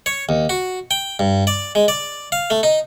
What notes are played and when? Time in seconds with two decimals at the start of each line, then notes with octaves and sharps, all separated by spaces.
0.06 C#5
0.29 D#2
0.50 F#4
0.91 G5
1.19 G2
1.47 D5
1.75 G#3
1.88 D5
2.32 F5
2.50 A3
2.63 D#4